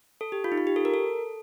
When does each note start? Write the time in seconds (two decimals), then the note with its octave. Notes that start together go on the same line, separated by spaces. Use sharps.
0.21 A4
0.32 G4
0.44 F4
0.52 D#4
0.58 F4
0.67 G4
0.76 A4
0.85 A#4
0.94 A4